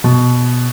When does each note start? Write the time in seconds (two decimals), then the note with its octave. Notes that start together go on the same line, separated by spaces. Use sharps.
0.04 B2